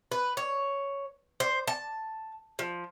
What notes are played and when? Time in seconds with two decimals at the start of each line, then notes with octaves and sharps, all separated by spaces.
0.12 B4
0.37 C#5
1.40 C5
1.68 A5
2.59 F3